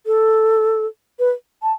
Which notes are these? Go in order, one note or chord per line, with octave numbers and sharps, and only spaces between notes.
A4
B4
A5